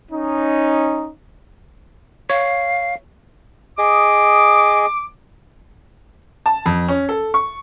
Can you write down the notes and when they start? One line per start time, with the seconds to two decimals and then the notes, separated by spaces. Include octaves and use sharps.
0.11 C#4 D#4
2.30 C#5 F5
3.78 G#4 D#5 D6
6.46 A5
6.66 F2
6.88 C#4
7.09 A4
7.34 C#6